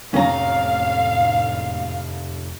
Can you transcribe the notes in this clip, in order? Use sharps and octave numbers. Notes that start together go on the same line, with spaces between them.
F#1 F2 A2 C3 C#4 F5 A#5